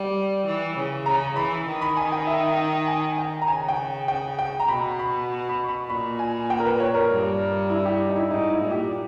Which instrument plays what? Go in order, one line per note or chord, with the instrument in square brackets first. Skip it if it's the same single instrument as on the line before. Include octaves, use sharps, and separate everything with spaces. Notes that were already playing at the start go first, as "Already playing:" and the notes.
Already playing: [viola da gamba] G3
E3
C#3
[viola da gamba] C#3 [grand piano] A#5
[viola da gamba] E3 [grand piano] B5
[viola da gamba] D#3
[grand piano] B5
G#5
G5
E5
G5
G#5
G5
A#5
[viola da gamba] C#3 [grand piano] G#5
[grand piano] G5
G5
G5
A#5
[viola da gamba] B2 [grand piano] B5
[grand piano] B5
B5
C#6
B5
[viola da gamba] A#2 [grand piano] B5
[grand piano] G#5
G5
A#4
B4
C#5
A#4
[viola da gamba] G2
[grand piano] E4
G4
D#4
E4
[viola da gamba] G#2 [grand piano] D#4
[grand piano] E4
[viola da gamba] A#2
[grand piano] G4